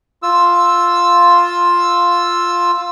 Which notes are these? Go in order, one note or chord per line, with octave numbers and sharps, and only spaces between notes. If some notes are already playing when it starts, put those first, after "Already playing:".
F4 E6